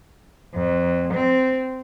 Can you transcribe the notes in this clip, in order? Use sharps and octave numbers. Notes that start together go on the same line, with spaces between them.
F2
C4